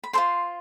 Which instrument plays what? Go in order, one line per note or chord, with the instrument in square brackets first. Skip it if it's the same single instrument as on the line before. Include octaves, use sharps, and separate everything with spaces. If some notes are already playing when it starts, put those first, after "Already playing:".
[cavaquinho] B5
F4 A4 C5 C6